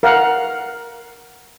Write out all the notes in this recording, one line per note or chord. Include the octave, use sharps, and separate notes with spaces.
A#4 F5 F#5